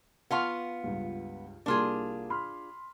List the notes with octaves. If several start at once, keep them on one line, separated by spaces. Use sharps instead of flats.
B3 F4 F5 F#5 A5 C#6
C#2 G2
C2 A#3 D4 F4 G#4
B5 C6 F6